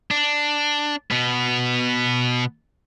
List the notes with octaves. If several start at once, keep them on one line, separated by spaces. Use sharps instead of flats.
D4
B2 B3